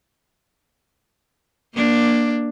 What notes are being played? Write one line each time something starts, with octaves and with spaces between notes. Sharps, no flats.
A#3 D4